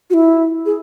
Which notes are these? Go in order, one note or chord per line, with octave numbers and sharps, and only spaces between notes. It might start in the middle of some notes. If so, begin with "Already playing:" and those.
F#4
E4
G#4